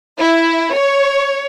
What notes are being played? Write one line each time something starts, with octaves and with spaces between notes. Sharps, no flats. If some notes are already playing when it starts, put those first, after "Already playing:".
E4
C#5